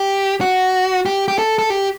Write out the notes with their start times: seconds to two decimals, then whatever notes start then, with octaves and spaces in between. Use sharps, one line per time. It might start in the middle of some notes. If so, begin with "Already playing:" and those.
Already playing: G4
0.41 F#4
1.06 G4
1.28 G4
1.38 A4
1.59 A4
1.70 G4